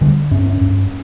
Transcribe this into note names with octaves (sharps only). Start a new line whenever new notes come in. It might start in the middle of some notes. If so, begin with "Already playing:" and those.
D3 G3
G2 C#4
C#4
G2